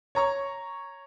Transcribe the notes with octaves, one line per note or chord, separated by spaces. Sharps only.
C#5 A#5 C#6